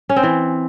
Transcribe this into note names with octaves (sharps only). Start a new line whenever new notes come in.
C#4
C4
E3